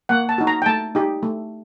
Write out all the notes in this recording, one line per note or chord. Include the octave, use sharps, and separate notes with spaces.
A#3 F#5
A5
D#4 F#4
A#5
G5
A3 A5
D#4 G4
A3